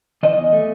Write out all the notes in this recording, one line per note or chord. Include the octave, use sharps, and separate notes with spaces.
E3 D#5
E2
A3